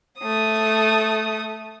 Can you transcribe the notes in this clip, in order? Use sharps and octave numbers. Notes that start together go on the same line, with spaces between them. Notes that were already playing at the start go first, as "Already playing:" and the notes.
A3 D#6